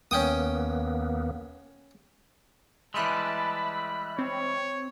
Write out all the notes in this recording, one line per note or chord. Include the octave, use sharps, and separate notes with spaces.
D#2 A#3 B3 C#4 G5 D#6
E3 G3 G#3 E5 A5 B5 E6 F#6
C4 C#5